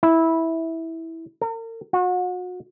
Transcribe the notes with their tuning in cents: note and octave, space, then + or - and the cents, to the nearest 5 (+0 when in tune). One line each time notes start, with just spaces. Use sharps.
E4 -10
A#4 -40
F#4 -35